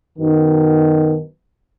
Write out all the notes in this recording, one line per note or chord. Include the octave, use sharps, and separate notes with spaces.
F#2 B2 D#3